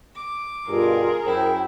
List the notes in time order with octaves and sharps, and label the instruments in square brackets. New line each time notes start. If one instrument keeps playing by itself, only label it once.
[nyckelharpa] D6
[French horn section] G2 B2 [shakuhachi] F4 [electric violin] G#4 A#4
[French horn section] F#2 C5 [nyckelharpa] E4 [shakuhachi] G5